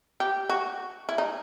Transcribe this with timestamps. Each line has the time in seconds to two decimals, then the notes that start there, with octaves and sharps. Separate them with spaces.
0.20 G4
0.49 F#4
1.09 E4
1.18 D#4